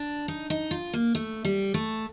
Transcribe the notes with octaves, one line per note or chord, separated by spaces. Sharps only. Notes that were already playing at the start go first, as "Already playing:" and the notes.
Already playing: D4
D#4
D#4
F4
A#3
A3
G3
A3